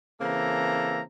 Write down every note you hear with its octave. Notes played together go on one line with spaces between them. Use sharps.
C#3 E3 A#3 C4 A4 A#5